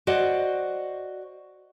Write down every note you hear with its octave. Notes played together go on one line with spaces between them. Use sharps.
F#4 C5 D5 D#5 F#5